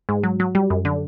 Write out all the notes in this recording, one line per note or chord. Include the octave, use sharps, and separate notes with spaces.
G#2
F#3
F#3
G3
F#2
D3